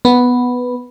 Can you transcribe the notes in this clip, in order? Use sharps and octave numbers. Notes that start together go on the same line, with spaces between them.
B3